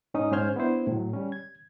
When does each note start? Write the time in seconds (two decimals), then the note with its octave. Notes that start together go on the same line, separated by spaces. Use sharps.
0.14 G#2 C#4 D#4 D#6
0.32 G#2 C#4 C5 F6 G6 G#6
0.56 B3 D4 E4 C5
0.87 A2 F#3
1.13 G3 C#4
1.32 G#6